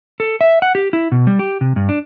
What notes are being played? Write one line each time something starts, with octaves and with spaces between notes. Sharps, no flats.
A4
E5
F#5
G4
E4
B2
G3
G4
C3
G2
D4